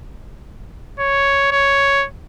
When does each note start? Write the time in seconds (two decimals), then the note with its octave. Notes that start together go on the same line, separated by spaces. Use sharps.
0.99 C#5
1.51 C#5